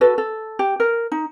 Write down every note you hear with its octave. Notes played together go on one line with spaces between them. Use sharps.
F#4 A4 B4
A4
G4
A#4
D#4